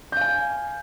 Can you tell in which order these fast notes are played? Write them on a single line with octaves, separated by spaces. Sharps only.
G6 F5 G#5